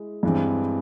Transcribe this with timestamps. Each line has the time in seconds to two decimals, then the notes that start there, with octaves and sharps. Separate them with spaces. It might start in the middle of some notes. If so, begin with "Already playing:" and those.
Already playing: G#3 E4
0.23 G2 E3 G#3 C4